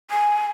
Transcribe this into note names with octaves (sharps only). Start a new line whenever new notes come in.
G#5